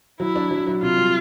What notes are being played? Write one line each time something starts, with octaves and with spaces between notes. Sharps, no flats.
F#3 E4
D4
F#3
F#3
C3 F4
G3